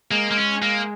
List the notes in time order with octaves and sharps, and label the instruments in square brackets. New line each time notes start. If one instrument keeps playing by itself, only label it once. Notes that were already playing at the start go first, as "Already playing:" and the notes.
[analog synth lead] G#3 [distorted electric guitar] A#3
[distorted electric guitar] A#3
C#4
A#3